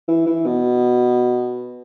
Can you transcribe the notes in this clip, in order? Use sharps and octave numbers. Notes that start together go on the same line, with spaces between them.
E3
E3
B2